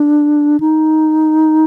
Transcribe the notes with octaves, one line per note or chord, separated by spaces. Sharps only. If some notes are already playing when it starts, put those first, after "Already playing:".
Already playing: D4
D#4